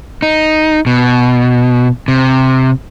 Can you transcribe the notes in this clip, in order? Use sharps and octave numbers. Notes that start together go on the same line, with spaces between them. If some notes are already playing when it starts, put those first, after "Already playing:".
D#4
B2
C3